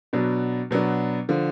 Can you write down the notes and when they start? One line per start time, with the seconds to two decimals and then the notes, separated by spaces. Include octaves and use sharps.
0.13 B2 F#3 B3 D4
0.71 B2 F#3 B3 D4
1.29 D3 F3